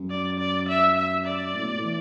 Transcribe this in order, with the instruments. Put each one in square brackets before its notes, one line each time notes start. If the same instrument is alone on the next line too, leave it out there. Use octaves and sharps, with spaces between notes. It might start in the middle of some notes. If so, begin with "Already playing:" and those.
Already playing: [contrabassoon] F#2
[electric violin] D5
D5
E5
E5
D5
[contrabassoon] A2
B2
A2
E3